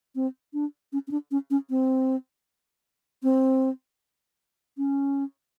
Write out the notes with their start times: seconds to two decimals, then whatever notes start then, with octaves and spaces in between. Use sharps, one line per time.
0.15 C4
0.53 D4
0.93 C#4
1.08 C#4
1.11 D4
1.31 C#4
1.50 C#4
1.70 C4
3.23 C4
4.77 C#4